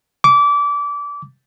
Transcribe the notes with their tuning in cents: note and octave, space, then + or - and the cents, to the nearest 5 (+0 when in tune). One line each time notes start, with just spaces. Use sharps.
D6 -25